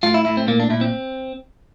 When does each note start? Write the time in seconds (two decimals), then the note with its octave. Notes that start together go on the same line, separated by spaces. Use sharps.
0.03 A2 F4
0.14 E4
0.25 A2 E4
0.37 C4
0.48 A#2 A#3
0.60 D4
0.70 A#2 E4
0.81 C4